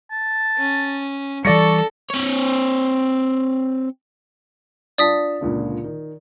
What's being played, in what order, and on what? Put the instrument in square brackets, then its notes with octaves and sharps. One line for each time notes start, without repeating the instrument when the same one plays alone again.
[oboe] A5
[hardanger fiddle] C#4
[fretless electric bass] E3 G3 [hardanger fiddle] A4 [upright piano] D5 A#6 C#7 [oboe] C#6
[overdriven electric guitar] C4 C#5
[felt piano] D4 F4 A5 [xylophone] D5 D#6 B6
[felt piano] C#2 A#2 D3
D#3